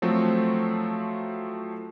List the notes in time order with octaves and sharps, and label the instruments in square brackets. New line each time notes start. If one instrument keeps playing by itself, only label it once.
[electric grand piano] F3 F#3 A3 C4